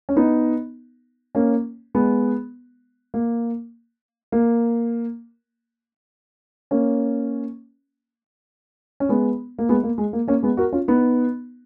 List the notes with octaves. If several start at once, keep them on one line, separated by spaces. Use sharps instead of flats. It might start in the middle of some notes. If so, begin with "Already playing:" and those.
C#4
B3 D#4
A#3 C#4
G#3 B3
A#3
A#3
A#3 C#4
C#4
G#3 B3
A#3
G#3 B3
A#3
G#3
A#3
A#3 C#4
G#3 B3
F#4 A#4
C#4 F4
B3 D#4